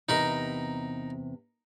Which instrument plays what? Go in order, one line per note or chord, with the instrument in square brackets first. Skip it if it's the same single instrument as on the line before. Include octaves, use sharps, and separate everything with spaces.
[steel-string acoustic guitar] E2 C3 [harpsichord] D#4 A#4 B5